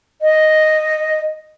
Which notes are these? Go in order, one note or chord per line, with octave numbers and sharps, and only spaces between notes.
D#5